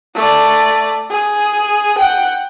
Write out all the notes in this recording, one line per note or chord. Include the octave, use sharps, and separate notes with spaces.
A3 D5
G#4
F#5 G5